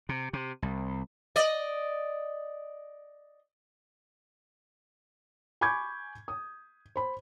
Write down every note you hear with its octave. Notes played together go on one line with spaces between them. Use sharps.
C3
C3
C2
D5 D#5
G#5 B5 C#6 D6 G6 G#6
D#6
C5 B5